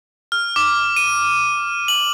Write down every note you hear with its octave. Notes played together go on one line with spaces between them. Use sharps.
F6
D6
D#7
F#7